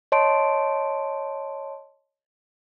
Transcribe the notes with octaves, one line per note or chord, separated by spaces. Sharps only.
C#5 D#5 A5 C6 D7